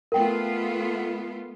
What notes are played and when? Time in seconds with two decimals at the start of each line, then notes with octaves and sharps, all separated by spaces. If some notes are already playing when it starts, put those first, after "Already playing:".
0.12 A3 B3 F4 A#4 G5